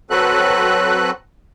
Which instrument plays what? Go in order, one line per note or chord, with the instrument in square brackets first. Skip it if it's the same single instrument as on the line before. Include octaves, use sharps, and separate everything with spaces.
[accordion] F#3 C4 F#4 A4 B4 F#6